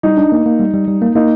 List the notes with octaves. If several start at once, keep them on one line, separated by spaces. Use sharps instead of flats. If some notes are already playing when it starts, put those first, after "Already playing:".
G3 D#4
D4
A#3
A#3
G3
G3
G3
A#3
A#3 D#4